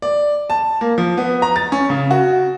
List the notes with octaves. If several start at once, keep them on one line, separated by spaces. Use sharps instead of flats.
D5
A5
A#3
F3
B3
A#5
A6
C#4
C#3
F#4